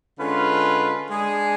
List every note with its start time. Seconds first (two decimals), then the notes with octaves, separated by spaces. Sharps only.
0.19 D3 G#3 C#4 F4 B4
1.10 G#3 D4 G#4